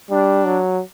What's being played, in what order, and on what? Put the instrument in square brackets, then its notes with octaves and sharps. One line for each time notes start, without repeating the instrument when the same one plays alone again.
[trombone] G3 [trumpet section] D4
[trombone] F#3